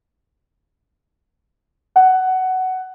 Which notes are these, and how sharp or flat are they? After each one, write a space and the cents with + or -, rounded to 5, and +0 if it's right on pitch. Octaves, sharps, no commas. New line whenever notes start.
F#5 +15